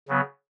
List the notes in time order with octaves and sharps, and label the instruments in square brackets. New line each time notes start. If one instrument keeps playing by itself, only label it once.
[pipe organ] C#3 F#3 B3